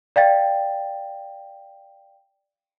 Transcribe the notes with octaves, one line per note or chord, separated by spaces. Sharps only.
D5 F5 G5 A6